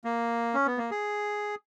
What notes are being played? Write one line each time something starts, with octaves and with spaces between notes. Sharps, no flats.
A#3
C#4
B3
A#3
G#4